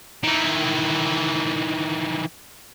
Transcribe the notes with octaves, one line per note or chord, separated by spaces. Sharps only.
D#3 E3